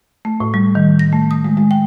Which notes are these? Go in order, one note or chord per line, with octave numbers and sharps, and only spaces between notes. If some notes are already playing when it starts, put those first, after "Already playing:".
A3
A2
G3
D#3
A#6
A3
D#6
G#3
G#3
G5